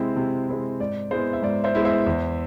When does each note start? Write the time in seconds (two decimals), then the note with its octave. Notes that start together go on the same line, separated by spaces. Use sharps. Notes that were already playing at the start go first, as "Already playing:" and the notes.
Already playing: C3 G#3 C4 E4 C5
0.16 C3
0.49 G#3 C4 E4
0.80 G#2 D5
1.11 G#3 B3 E4 C5
1.33 E5
1.43 G#2 D5
1.64 C5 E5
1.75 G#3 B3 E4
1.85 C5 E5
2.06 E2